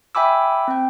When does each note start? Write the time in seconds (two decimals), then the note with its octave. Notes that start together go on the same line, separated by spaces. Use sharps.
0.15 E5 G5 G#5 B5 D6 E6
0.68 C4 G5